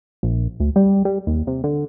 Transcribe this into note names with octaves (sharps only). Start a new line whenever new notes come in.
A#1
D2
G3
G3
D#2
C3
D3